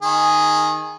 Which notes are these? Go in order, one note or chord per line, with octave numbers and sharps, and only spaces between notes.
D#3 G#4